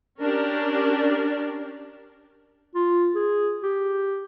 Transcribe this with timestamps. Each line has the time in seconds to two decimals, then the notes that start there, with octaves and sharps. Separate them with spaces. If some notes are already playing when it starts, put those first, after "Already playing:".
0.21 C#4 D4 G4 A#4 D5
2.75 F4
3.15 G#4
3.63 G4